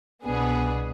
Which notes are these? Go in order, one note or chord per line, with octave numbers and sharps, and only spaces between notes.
C2 B2 B3 D4 G#4